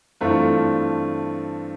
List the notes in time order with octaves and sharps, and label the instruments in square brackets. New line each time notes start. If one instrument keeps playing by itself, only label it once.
[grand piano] G2 E3 A3 C4 F4